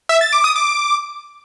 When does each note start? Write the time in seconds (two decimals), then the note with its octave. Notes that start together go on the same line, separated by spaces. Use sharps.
0.09 E5
0.21 A6
0.33 D6
0.44 D#6
0.56 D6